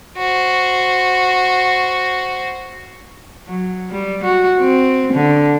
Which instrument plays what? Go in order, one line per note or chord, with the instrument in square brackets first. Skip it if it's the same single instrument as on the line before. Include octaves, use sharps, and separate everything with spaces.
[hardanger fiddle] F#4 C5
[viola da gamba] F#3
G3
F#4
C4
D3